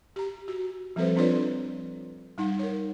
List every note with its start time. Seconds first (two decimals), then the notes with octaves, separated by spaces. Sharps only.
0.16 G4 A#5
0.48 F#4
0.96 F3 G3 C4 A4 B4 C5
1.17 C4 D4 F4 B4 C#5 D5
2.38 G3 D#4 F#5
2.59 A#4 C#5